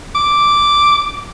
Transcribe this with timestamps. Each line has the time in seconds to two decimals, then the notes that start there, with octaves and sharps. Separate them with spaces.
0.15 D6